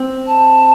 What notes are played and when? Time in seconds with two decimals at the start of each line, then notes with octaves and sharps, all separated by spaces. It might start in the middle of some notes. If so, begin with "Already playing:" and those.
Already playing: C4
0.27 A5